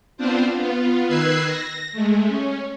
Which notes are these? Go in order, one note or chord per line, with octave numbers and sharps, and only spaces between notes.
B3 C4 D4 F4 C5
B3 F4
D#3 B4 E6 F#6 G#6 C7
A#6
G#3 A3
C#4